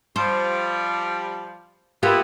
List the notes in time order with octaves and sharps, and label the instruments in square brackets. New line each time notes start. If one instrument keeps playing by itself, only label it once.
[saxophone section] F3 G3 [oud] C5
[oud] A#3 F4 G4 [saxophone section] B3 E4